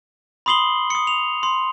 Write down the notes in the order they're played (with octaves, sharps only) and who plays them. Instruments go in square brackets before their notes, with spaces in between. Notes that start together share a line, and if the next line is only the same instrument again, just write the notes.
[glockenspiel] B5 C6 D#6 C7 F#7 G7
D#6 C#7
F7
C6